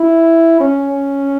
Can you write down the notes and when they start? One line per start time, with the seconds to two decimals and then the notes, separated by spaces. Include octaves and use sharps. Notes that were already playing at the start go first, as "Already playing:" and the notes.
Already playing: E4
0.61 C#4